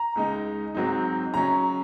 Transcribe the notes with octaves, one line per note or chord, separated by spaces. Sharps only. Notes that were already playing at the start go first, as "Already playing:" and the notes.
Already playing: A#5
C#2 C#3 G#3 D#4
G#2 F#3 C4 D#4
C#3 F#3 C#4 A#5